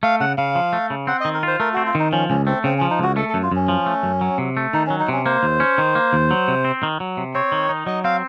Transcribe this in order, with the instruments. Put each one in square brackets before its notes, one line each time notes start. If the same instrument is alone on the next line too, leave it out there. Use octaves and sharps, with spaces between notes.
[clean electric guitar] A3 [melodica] F5
[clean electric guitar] C#3 [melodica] F#5
[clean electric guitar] C#3 [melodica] F5
[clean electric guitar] F3
A3
C#3
[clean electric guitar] C4 [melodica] F#5
[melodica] D#5
[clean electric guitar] D#3
[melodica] A#4
[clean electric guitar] F4 [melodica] C5
[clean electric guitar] A3 [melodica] A#4
[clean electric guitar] C4 [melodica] F#4
[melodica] F4
[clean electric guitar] D#3 [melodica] D#4
[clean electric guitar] F3 [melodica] C#4
[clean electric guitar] C#2 [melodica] C#4
[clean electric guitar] A3 [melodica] C4
[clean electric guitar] C#3 [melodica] C4
[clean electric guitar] F3 [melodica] C#4
[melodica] D#4
[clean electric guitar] C#2 [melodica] F#4
[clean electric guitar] A3 [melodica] A4
[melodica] A4
[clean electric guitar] F#2
[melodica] F4
[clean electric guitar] F#2 [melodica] C#4
[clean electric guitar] F3
A3
F#2
F#3
C3
A3
[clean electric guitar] D#3 [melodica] D#4
[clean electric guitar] F#3 [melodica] C#4
[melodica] D#4
[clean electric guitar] C3 [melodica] C#4
[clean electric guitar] A#3 [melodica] C5
[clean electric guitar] D#2
C#4
D#3
A#3
D#2
F#3
C3
C4
D#3
F#3
C3
[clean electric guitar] C4 [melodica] C#5
[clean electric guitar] D#3
D#4
[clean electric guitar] F#3 [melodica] D#5
[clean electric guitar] C4 [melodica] F5